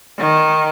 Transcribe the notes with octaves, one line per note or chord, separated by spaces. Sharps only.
D#3